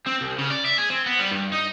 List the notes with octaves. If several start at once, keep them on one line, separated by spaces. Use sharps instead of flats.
C4
C2
C#3
D5
E5
G#4
C4
B3
G3
G2
D#4